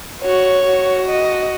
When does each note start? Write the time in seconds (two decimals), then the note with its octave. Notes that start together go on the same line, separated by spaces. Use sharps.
0.22 F#4 C#5
0.66 F#4
1.08 D#5